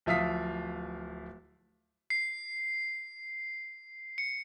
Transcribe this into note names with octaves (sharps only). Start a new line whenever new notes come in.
D1 F3 E5 F5 D#6 B6
C7
C#7